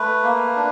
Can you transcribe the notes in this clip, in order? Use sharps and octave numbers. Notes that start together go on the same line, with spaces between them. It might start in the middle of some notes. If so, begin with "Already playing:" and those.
Already playing: A3 B4
A#3
D4